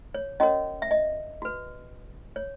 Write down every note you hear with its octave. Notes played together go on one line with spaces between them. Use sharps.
C#5
C#4 F#4 A#4 C#5 D#5
E5
D#5
F#4 B4
C#5